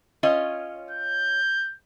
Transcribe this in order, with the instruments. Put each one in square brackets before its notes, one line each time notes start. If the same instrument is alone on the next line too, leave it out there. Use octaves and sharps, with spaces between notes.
[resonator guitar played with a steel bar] C#4 F4 D#5
[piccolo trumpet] G6